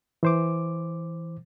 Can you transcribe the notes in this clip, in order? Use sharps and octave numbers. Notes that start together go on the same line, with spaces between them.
E3 C5 D6